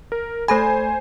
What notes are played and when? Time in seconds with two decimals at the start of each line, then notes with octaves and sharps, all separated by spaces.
0.12 A#4
0.48 A3 A4 C5 G#5 B5